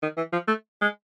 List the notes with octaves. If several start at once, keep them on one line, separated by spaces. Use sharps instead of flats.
D#3
E3
F3
A3
G#3